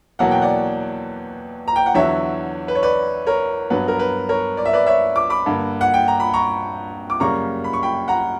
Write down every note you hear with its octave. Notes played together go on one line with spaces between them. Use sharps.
E2 B2 F#3 A#3 F#5
G5
D5 F#5
A#5
G5
F#5
E2 D3 F#3 C#5 E5
B4
C#5
B4 D5
A#4 C#5
G2 F#3 B3 B4
A#4
B4
A#4 C#5
D5
E5
B4 D5
C#5 E5
D6
B5 D6
G2 D3 A#3
F#5
G5
A#5
B5
A#5 C#6
D6
F#2 C#3 G3 A#3 A#5 C#6
B5
C#6
G5 B5
F#5 A#5